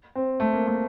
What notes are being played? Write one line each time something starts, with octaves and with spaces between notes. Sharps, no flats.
C4
A3
A#3
A3